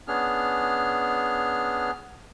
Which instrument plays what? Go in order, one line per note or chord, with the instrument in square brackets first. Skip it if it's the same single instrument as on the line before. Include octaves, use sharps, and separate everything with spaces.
[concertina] B3 C#4 D4 G#4 F6